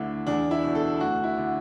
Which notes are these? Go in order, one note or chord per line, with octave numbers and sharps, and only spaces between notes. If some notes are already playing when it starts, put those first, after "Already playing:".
Already playing: D2 D3 E4
E2 D4
E4
B2
A4
D2 F#4
E4
D3